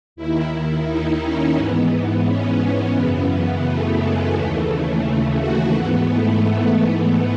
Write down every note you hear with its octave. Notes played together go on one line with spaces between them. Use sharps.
D#2 D#3 E4
E4
D#4
C#4
G#2 E3 B3
B3
C#4
F#2 C#3 E3 B3
B3
A3
G#3
D#2 C#3 E3 A3
F#4
G#2 E3 B3
A3
B3
A3